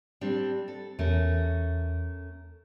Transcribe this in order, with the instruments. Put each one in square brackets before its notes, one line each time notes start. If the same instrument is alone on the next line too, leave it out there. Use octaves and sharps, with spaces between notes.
[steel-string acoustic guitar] G3 C4 D4
A4
[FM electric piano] E2 [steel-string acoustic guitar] A3 C#4 A#4